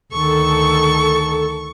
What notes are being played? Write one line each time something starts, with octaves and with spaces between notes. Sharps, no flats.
D2 D#3 A4 C#6